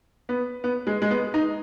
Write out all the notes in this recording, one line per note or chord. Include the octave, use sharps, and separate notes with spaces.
B3
B3
G#3
G#3
B3
D#4